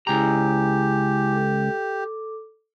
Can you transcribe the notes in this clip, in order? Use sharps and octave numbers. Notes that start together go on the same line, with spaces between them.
C#2 E4 G4 G#4 G#5 A#5
A4 D6